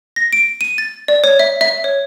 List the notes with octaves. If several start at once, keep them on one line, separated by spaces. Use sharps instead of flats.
A#6
D7
D#7
A6
D5
C#5
E5
E5
C#5